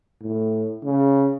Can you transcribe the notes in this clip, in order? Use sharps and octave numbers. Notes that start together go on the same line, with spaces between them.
A2
C#3